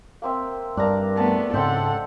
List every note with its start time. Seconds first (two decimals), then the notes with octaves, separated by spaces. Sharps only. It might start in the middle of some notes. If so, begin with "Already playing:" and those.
0.22 A#3 C4 E5
0.77 G2 D4 A#4 A#5
1.17 A3 B3 A5
1.54 G#2 C#3 C4 A4 E5 F#5 G5